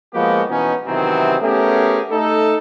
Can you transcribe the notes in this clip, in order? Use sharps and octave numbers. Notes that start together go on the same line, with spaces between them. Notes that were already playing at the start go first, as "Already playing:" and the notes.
F3 G#3 A#3 B3 F#4 G4
B2 E3 B3 C#4 D#4
C3 D#3 E3 F#3 B3 C4
A3 B3 C#4 G4 G#4 A#4
A3 D#4 A4